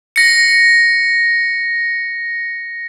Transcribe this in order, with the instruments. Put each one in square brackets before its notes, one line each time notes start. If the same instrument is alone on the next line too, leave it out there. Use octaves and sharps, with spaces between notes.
[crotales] A#6 C#7